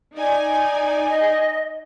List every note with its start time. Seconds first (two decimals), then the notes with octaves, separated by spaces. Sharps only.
0.15 D#4 D5 G#5
1.09 D#5